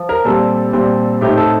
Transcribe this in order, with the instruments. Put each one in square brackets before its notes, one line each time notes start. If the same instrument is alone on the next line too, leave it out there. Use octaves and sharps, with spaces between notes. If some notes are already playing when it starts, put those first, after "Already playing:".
Already playing: [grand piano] F3
A#4
A#2 G3 C4 A4
A#2 G3 C4
A2 A3 C4 D#4 G4
A4